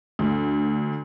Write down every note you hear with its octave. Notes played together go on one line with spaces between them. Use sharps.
D2 D3